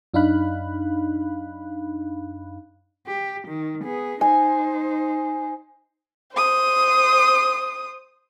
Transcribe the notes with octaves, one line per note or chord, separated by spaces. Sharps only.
F#2 D4 D#4 F5 B5 F#6
G4
D#3
B3 G#4
D#4 C5 G#5
C5 D#6